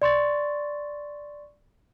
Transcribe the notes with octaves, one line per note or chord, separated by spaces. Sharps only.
D5 C6 C#6 A6